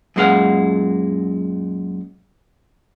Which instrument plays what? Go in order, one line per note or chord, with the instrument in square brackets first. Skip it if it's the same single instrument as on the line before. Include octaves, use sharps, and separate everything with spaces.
[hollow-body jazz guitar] F#2 A#2 G#3 B3 F5 F#5